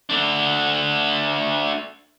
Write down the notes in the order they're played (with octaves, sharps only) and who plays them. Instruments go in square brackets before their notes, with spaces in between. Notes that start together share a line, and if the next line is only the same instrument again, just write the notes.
[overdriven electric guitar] A3 D4